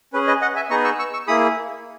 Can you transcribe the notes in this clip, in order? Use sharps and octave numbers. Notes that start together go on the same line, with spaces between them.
C#4 G#4 B4
B4 D#5
D#5 F#5
E5 G#5
B3 D#4 G#4 A#5 C#6
C#6 E6
C#6 E6
C#6 E6
A#3 E4 G#4 B5 D#6